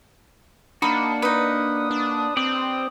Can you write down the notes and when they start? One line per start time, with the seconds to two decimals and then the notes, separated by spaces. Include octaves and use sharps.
0.82 A#3 D4 D#4 F#4 B5 D#6
1.22 D#4 B4 D#6
1.91 D4
2.37 C4 G4 D5